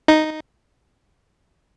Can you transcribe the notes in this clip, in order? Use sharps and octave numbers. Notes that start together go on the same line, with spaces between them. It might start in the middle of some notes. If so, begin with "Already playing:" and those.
D#4